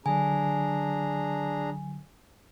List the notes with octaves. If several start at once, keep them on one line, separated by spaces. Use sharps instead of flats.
D3 F#3 D4 G#4 G#5 A#5